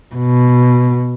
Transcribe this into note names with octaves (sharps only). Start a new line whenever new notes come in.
B2